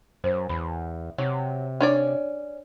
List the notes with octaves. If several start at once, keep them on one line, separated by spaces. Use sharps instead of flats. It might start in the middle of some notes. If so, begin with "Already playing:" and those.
F#2 C5
E2 B5
C3 F#3
C#4 D4 C#5 D5